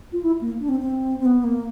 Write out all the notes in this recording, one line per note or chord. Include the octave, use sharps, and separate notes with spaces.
F4
E4
A#3
D4
C4
C4
C4
B3
A#3